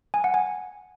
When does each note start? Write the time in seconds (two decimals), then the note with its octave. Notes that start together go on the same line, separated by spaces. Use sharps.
0.14 G#5
0.24 F#5
0.34 G#5